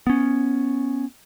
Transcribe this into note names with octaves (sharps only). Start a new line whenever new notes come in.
B3 C#4